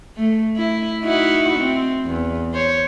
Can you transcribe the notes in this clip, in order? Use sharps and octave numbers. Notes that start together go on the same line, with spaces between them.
A3
E4
D#4 E4 F#4
C4
E2
C5 C#5